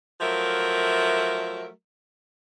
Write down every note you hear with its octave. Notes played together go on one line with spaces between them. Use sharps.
F3 F#3 A3 A#4 E5